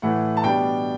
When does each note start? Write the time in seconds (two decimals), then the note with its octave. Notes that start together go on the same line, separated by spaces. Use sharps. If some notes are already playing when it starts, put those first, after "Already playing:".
0.02 A2 E3 A3 F#5
0.37 A5
0.44 B2 G3 D4 G5